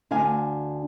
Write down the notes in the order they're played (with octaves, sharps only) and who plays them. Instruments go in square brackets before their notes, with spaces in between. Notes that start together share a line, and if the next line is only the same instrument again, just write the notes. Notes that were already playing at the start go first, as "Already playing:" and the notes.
[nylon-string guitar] D2 D4 F5 G#5